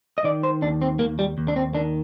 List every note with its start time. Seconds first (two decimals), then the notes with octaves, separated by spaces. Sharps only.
0.18 D#5
0.24 D#3 D5
0.43 C5
0.62 D#2 D4
0.82 C4
0.99 D#2 A#3
1.19 G3
1.38 D#2
1.48 D4
1.56 C4
1.75 D#3 D4